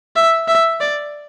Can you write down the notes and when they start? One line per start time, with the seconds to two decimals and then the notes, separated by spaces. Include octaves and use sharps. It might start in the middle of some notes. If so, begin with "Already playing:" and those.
0.16 E5
0.48 E5
0.81 D5